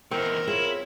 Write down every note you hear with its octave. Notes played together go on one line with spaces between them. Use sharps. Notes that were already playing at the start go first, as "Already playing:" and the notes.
E2 D#3 C4 A#4
E4 F4 G#4 C#5